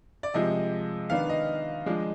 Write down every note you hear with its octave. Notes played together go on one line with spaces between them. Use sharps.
D5
C3 F3 G#3 D#5
D#3 B3 D4 F5
D#5
F3 G#3 D4